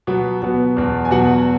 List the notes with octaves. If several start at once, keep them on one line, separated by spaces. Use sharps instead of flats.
B2 F#3 B3
B2 F#3 B3
E2 B2 F#3
G#5
E2 B2 F#3 F#4 F#5